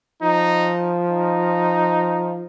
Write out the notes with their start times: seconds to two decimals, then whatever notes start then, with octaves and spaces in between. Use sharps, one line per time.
0.23 F3 D#4
1.09 D#4